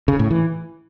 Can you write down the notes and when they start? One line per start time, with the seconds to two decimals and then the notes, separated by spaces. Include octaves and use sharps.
0.08 C#3
0.19 A2
0.31 E3